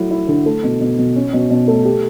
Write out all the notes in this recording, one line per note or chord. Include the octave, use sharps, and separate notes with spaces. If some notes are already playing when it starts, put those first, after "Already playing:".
Already playing: F#3 A3 E4
E4
D3
A3
B2
B2
B2
C#4
B2
B2
A3
G4